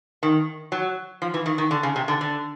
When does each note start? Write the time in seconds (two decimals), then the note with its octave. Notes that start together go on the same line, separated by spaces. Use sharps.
0.23 D#3
0.72 F#3
1.22 F3
1.34 E3
1.46 D#3
1.58 D#3
1.71 D3
1.83 C#3
1.96 C3
2.08 D3
2.21 D3